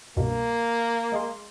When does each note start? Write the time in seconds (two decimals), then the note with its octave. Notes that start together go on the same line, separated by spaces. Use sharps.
0.17 C2 G2 B2 A#3
1.12 G#3 G#4 C6